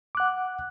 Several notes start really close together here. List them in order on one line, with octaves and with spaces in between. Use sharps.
D6 F#6 F#5